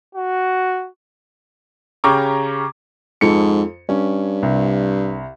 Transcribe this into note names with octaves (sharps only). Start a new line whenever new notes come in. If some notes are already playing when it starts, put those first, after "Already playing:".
F#4
C#3 C#4 G4 A#5 C#6 D6
F2 G#2 A4 C#7
G2 C#4
C2